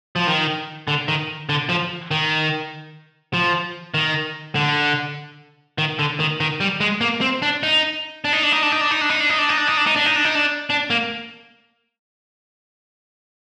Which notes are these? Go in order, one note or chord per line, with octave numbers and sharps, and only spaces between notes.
F3
D#3
D3
D#3
D3
F3
D#3
F3
D#3
D3
D#3
D3
D#3
D#3
G3
G#3
A#3
C4
D4
D#4
D4
D#4
D4
D#4
D4
D#4
D4
D#4
D4
D#4
D4
D#4
D4
D#4
D4
D#4
D4
D#4
D4
D#4
D4
D#4
D4
D4
A#3